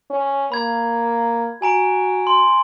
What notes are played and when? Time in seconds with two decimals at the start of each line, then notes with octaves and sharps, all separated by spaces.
0.11 C#4
0.52 A#3 B5 G#6
1.62 F#4 G#5 A#5 D7
2.27 C6